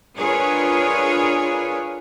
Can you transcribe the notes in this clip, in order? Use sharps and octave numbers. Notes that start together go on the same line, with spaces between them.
D4 F4 G#4 A#4 B4 C#5